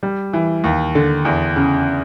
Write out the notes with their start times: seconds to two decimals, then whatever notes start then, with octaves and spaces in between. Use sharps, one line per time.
0.03 G3
0.33 E3
0.64 D#2
0.95 D3
1.25 E2
1.56 C#3